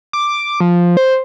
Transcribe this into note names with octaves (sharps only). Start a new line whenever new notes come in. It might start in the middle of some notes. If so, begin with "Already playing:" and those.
D6
F3
C5